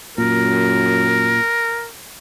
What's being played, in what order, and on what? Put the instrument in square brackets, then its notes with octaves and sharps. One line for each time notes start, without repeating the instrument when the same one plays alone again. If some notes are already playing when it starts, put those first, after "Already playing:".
[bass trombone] F#2 [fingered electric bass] A#2 [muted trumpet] A#4